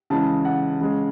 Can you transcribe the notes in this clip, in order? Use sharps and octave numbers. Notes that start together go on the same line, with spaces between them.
C#3 E3 G#3 A5
F#5
C#3 G#3